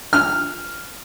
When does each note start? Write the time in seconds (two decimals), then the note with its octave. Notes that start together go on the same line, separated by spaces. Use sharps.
0.13 F6